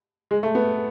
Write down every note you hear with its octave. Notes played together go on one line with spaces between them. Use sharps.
G#3
A3
B3